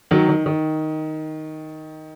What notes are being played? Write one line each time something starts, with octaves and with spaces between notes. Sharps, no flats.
D#3 F#3
D#3
D#3